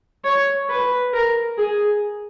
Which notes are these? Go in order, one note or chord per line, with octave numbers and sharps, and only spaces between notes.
C#5
B4
A#4
G#4